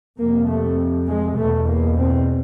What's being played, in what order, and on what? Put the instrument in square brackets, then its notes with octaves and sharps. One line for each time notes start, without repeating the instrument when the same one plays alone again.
[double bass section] F2 C3 A#3
A3
G#3
E2 B2 A3
A#3
C4